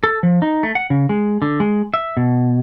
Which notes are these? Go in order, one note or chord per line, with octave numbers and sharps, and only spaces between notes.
A4
F3
D#4
A3
F#5
C#3
G#3
D3
G#3
E5
B2